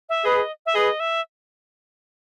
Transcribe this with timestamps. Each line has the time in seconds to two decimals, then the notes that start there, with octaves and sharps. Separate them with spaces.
0.09 E5
0.25 G#4 B4 D#5
0.66 E5
0.75 G#4 B4 D#5
1.00 E5